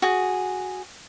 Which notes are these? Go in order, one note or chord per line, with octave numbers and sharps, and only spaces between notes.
F#4 G#4